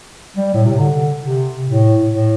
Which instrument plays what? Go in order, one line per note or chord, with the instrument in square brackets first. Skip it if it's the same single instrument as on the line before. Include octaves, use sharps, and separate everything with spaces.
[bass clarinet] G3
A2
C3
D3
C3
A2
A2